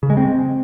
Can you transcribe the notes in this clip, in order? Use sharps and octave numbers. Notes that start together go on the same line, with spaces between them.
C#3
G#3
C4